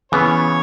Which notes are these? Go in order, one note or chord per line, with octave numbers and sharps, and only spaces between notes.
C#3 E3 B3 C#5